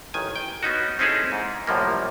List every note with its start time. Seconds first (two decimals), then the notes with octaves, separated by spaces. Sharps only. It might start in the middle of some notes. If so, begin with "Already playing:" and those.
0.14 A1 D#3 G#5
0.36 G5
0.63 B3 C#4 D#4 F#4
0.99 C4 C#4 D#4 E4 G#4 A4
1.32 G#2
1.67 C2 F#2 A2 F3 G3 A#3